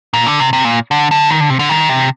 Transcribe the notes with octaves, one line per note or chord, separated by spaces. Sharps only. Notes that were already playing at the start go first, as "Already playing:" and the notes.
A#2
D3
C3
C3
A#2
D3
D3
D#3
D3
C3
D3
D#3
C3